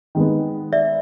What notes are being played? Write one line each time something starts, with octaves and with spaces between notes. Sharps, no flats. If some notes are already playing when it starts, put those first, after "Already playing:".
D#3 G#3 B3
D5 E5